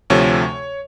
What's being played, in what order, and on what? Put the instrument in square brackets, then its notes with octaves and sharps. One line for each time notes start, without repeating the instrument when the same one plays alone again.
[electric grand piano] D2 C3 F3 A3 C#5